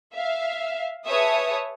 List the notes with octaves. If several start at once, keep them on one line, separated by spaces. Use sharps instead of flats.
E5 F5
G#4 B4 C#5 E5 A5 D#6